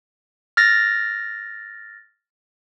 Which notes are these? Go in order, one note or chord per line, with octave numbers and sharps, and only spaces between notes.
F6 A6 A#6